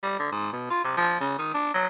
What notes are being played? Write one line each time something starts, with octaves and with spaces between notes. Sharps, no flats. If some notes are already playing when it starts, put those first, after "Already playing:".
G3
D3
G#2
B2
F4
C3
F3
C#3
D#3
D4
F#3